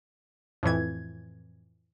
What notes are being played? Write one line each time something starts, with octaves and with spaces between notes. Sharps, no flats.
F2 A2 E3 G#6